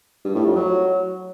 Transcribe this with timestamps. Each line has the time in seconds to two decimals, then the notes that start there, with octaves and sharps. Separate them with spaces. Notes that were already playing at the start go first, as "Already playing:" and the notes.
0.25 G2
0.35 A2
0.45 F2
0.56 F#3